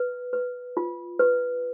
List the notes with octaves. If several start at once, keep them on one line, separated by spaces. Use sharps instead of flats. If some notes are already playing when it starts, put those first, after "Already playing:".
Already playing: B4
B4
F4
B4